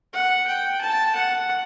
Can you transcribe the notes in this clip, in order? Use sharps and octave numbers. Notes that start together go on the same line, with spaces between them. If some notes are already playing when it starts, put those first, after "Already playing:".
F#5
G5
A5
F#5